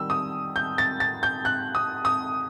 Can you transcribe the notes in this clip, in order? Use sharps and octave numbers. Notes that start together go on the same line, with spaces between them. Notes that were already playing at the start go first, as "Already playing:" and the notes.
Already playing: D#3 G3 E6
D#6
G6
A6
A6
G6
F#6
D#6
D#6